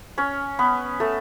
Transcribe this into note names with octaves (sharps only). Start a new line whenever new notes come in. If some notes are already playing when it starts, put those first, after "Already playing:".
C#4 C#5
B3 B4
A3 A4